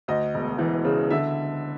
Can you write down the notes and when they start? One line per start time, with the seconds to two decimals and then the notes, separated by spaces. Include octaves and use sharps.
0.08 D2 D#5
0.34 E1
0.59 E3
0.84 C#3
1.10 D3 E5